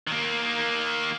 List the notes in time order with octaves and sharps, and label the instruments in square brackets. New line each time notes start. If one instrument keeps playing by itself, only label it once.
[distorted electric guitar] D#3 A#3